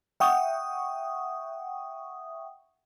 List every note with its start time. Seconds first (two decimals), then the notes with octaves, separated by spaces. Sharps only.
0.20 E5 F#5 G5 C#6 D#6